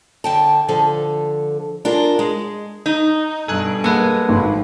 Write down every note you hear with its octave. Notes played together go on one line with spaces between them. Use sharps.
D3 G5 A5
D3 F3 A4
D4 F4 G#4 A#4
G#3
D#4
G2 B2 A4 G#5 F#6
G#3 A#3 A4 B4 F#5
G#1 F3